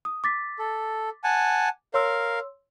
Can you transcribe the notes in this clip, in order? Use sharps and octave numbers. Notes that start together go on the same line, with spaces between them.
D#6
D6 A6 B6
A4
F#5 G#5 A5
A#4 C#5 F5 C6 E6